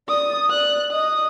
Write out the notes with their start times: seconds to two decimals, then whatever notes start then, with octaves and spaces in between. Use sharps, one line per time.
0.08 D5 D#6
0.50 D5 F#6
0.92 D#5 D#6